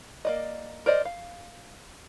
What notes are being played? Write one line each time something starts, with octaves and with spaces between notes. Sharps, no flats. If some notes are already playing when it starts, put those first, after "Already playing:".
A#3 D5 D#5
A#4 C5 D5 D#5
F5